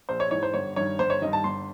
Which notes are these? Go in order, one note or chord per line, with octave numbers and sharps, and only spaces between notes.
A#1 C5
C#5
G#2 E3 C#5
C5
G1 C#5
G2 D#3 C#5
G1 C5
C#5
G2 D#3 D#5
A5
G1 C6